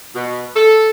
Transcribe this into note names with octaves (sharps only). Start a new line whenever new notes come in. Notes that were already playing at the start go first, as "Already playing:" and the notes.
B2
A4